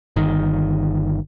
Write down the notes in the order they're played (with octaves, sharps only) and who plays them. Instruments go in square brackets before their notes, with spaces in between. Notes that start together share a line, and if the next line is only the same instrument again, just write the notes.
[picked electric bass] G1 D#3